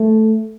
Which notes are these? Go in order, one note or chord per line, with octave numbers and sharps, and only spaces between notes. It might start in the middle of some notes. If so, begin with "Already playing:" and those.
Already playing: A3